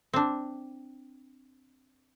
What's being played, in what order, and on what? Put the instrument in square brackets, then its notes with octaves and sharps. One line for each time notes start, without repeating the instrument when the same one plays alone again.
[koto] C4 D4